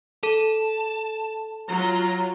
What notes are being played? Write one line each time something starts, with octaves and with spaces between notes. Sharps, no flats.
A4 A5
F#3 F4 A#5